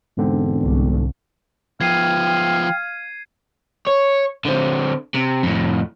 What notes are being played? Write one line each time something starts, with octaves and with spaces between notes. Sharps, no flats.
E1 G#2 D3 C4
C2
F3 B3 F5 G5 G#6 C7 D#7
C#5
D3 C4
C3
F2 A2